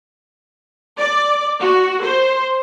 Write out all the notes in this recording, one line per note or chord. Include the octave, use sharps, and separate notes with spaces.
D5
F#4
C5